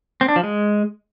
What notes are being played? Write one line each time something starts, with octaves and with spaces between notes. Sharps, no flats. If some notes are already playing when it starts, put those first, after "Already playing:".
C4
D4
F3
G#3